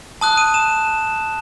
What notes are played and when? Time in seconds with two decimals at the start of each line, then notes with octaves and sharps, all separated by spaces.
0.21 A5 D#6 F#6
0.37 D#7
0.54 E7